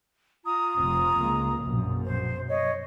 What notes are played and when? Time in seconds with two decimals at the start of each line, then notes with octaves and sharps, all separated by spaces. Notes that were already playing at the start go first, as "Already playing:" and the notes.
0.44 F4 A#5 D#6
0.78 F1 C4
1.19 C#2 G#3 A#3
1.62 A#1 F#2 B2
2.04 C5
2.48 C#5 D#5